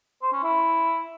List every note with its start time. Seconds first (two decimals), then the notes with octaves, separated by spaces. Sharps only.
0.22 C5
0.33 C#4
0.43 E4